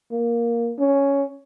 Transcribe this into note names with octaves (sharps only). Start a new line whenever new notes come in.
A#3
C#4